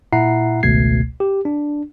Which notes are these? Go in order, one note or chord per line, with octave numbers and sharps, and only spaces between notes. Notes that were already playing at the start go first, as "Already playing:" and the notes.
A#2 E4 E5 F#5 A#5 C7
G#1 C#2 B2 A3 G#6 C7
G4
D4